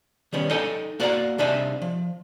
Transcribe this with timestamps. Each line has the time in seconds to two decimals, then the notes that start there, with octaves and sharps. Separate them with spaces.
0.33 D#3 G3 B3 C#4
0.51 D#4 A4 D#5 G5 G#5
1.00 A#3 F#4 D5 E5 F#5 A#5
1.38 C2 C3 D4 D#4 E5 G#5
1.82 F3